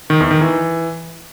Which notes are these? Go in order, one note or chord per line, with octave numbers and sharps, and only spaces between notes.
D#3
E2
D#3
E3